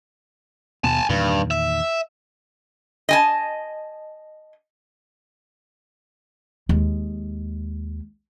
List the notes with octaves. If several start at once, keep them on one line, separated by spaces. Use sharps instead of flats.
D#2 B2 B3 G#5 A5
E2 G2 A#2 D#3
E5
D#5 G#5 A5
D#2 G#3